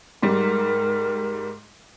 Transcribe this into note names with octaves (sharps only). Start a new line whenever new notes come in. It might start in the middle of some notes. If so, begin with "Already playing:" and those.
G#2 G3 A#4